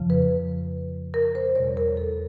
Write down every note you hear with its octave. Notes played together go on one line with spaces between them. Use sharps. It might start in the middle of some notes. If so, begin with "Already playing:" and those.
Already playing: F2 C#3 F3
B4
A#4
C5
E2 B2 G3 C#5
A#4
A4